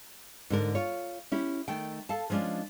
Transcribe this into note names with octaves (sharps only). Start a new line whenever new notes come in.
G#2 D3 A#4
F4 C#5
C#4 E4 G4
D#3 A3 G5
A4 F5 A5
F3 G#3 C#4 D4 F4